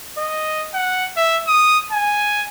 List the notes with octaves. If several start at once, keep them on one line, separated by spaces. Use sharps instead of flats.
D#5
F#5
E5
D#6
G#5